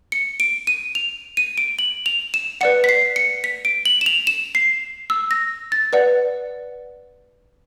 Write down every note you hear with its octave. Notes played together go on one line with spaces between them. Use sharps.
C#7
D7
D#7
F7
D#7
D7
F#7
F7
E7
B4 D5 F#5 C#7
B6
C7
C#7
B6
D7
F#7
E7
F7
E7
C7
E6
A#6
A6
B4 D5 F#5